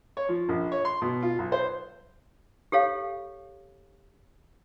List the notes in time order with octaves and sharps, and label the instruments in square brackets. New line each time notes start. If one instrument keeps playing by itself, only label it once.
[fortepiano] C#5
F3
A#1
C#5
C6
B2
F4
B1
C5
[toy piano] G4 A4 C#5 F5